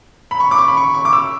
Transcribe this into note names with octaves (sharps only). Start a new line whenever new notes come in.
B5
C#6
D6
C#6
B5
C#6
C#6
D6
E6